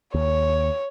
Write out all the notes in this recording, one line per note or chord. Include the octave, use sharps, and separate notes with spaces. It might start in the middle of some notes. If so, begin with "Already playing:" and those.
D#2 C#5